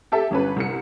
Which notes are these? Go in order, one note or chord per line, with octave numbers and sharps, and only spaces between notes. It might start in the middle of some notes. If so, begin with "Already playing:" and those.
G4 A4 E5
G1 C#4 B4
C2 C#7